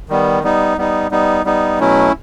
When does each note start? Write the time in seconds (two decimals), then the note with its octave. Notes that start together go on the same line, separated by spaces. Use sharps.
0.09 D#3 G3 B3
0.43 G3 B3 D#4
0.78 G3 B3 D#4
1.11 G3 B3 D#4
1.45 G3 B3 D#4
1.80 B2 F#3 A3 C#4 E4